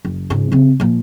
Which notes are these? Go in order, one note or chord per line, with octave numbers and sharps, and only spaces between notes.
F#1
C#2 G#2
C#3 C4
A#2 F3